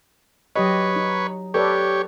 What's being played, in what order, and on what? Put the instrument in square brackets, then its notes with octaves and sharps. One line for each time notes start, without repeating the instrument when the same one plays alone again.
[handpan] F#3 G4 D#5 [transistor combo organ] B4 C#5
[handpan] D#4
[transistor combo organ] G4 C#5 [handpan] A4 B4 D5